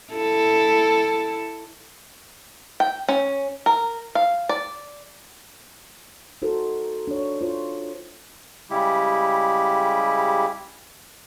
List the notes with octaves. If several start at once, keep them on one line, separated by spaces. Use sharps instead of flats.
E4 A4
G5
C#4
A#4
F5
D5
D#4 F#4 A4 A#4 C5
D4 C#5
F4 C5
C#3 G3 G#3 E4 G4